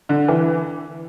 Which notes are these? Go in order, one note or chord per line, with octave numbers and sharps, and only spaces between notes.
D3
E3